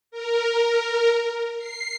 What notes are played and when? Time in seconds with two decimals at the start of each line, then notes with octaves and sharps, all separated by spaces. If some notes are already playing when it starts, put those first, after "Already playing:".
0.11 A#4
1.58 C7